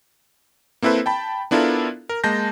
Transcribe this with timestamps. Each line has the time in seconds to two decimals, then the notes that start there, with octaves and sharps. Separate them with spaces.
0.82 A#3 C4 E4 A4 B4 C5
1.06 G5 A5 B5
1.51 B3 D4 E4 F4 A4 A#4
2.09 A#4
2.24 G#3 A#3 A5 G6 A#6